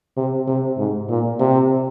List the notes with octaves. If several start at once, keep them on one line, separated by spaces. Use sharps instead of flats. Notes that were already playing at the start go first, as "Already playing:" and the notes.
C3
C3
G#2
A#2
C3